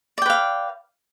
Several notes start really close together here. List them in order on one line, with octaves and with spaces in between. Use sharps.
D5 G5 B4 F5